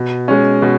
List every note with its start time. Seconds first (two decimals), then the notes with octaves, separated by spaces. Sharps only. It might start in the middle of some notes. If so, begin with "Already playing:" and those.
Already playing: B2
0.28 G#3 C#4
0.62 B2